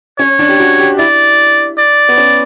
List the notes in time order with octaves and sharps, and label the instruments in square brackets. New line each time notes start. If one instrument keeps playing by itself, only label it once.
[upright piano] C#4 [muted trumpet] C#5
[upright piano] D4
G4
F#4
G4
[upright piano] E4 [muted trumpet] D5
[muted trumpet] D5
[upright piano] B3
C#4